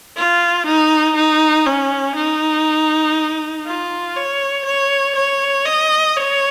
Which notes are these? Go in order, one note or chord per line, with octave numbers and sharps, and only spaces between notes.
F4
D#4
D#4
C#4
D#4
F4
C#5
C#5
C#5
D#5
C#5